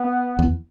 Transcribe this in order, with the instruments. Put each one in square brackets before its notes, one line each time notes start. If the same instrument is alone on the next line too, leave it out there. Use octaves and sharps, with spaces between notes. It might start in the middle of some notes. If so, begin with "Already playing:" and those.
Already playing: [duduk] B3
[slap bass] E2